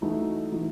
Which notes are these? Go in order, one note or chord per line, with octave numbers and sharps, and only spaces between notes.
E3 A3 D#4 F#4
E3 A3 D#4 F#4